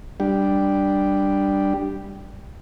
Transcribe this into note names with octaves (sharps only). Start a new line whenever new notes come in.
G3 D4 G4